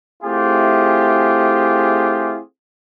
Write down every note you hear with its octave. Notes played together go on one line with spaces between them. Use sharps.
A3 C4 E4 F4 G4 G#4